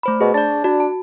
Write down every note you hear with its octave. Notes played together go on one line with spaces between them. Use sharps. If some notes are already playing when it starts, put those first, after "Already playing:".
A3 C5 B5
B2 G#4
D4 D5 A6
D4 F#4
A5